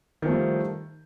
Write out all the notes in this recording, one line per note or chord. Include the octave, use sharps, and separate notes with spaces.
D#3 F3 G3 A3